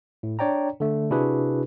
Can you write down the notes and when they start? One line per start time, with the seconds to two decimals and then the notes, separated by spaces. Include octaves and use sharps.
0.23 A2
0.39 D4 C#5 D5 G5 A#5
0.80 D3 A3
1.10 C3 D4 E4 F#4 G#4 B4